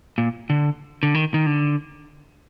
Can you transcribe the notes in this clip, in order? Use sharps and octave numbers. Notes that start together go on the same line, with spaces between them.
A#2
D3
D3
D#3
D#3
D3